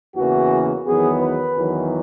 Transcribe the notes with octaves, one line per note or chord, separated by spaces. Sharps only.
E2 C#3 E3 A#3 F#4
E2 D#3 F#3 B3 G#4
B4
E2 D#3 F#3